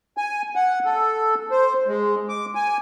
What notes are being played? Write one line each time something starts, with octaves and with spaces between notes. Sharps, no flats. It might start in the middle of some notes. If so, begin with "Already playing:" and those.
G#5
F#5
A4
C5
G#3
D6
G#5